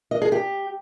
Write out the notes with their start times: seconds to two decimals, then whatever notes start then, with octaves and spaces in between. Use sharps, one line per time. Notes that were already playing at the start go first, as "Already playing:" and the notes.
0.11 D#5
0.22 G#4
0.32 G4